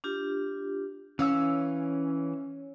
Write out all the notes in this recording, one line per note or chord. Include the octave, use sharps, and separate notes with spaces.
D4 F4 G4
E3 C#4 C#5 F5 E6